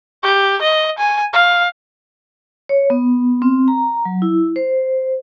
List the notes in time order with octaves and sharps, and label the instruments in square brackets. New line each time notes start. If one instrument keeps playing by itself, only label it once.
[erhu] G4
D#5
G#5
F5
[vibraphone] C#5
B3
C4
A#5
F#3
E4
C5